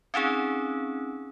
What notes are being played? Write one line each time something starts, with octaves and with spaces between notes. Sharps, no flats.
C4 C#4 D#4 G#4